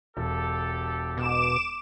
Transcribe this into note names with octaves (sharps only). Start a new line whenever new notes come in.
E1 G4 A4
B2 D6 E7